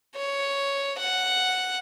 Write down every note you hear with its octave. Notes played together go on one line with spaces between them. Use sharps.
C#5
F#5